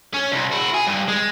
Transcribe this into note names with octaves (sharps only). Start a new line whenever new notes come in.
C#4
C2
E4 F#4
G#4
G2
G#3